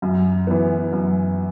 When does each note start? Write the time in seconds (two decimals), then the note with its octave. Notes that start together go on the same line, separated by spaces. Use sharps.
0.02 F#2
0.47 E3 B3
0.92 F#2